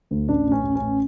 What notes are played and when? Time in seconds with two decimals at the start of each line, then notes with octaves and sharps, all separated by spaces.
0.11 D2
0.28 A1 D4
0.47 A1
0.52 C#4
0.64 A1
0.75 C#4
0.81 A1